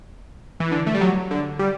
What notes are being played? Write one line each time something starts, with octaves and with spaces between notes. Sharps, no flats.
E3
D3
A3
G3
F#3
D3
G3